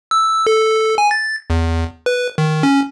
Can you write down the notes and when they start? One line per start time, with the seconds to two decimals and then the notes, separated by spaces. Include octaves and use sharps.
0.11 E6
0.47 A4
0.98 G#5
1.11 A6
1.50 E2
2.06 B4
2.38 D#3
2.63 C#4